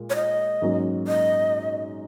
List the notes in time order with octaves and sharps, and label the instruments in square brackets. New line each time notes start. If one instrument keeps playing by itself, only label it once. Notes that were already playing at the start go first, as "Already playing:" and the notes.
Already playing: [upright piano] A#2 G#3
[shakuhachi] C#5
D#5
[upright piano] G#2 F#3 A#3 C#4
[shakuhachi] D#5